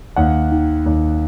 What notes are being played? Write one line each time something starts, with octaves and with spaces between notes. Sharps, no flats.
D#2 F#5
D#3
D#2